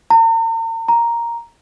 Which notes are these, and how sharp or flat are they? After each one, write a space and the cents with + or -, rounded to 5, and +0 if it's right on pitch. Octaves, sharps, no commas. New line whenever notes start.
A#5 -45
A#5 +0